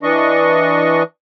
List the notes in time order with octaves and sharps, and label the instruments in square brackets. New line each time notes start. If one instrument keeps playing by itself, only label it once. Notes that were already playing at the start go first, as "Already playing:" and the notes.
[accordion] E3 D4 D#5 C#6